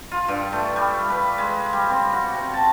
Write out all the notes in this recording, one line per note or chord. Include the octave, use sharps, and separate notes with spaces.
F4
G2
A3
G3
B4
G#3
G3
C4
F#4
C3
A5